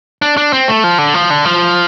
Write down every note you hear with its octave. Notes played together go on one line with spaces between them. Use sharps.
D4
D4
C4
A3
F3
D3
F3
D3
F3